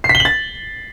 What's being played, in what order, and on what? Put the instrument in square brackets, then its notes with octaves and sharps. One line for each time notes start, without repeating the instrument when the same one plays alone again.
[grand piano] C7
B6
G7
F#7
A6